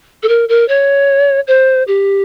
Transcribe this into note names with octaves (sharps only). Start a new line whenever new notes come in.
A4
A#4
A#4
C#5
C5
G4